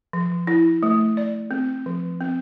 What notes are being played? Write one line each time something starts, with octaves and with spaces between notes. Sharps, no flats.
F3
E4
A3
D5
C4
F3
C4